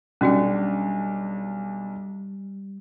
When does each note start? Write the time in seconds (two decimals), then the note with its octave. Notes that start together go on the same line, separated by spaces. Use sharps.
0.21 B1 G3 C#4 D4 F#4 G5